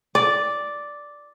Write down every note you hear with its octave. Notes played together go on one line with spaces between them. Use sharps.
D5